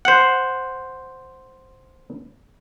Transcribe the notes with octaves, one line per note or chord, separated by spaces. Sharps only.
C5 F#5